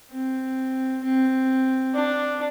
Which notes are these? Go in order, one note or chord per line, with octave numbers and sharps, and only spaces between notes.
C4
C4
D4